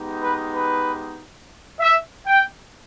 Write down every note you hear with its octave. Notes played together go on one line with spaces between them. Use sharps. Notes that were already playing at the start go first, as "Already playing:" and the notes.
Already playing: G#3 B3 D#4 G4
B4
B4
E5
G5